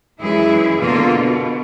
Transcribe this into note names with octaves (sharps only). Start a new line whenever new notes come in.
F#2 E3 G#3 E4 G#4
B2 D3 A#3 F4
B2